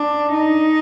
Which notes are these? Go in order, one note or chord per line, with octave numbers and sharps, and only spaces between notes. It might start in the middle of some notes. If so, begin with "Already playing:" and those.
Already playing: D4
D#4